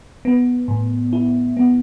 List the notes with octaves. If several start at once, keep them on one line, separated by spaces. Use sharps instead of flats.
B3
A2
E4
B3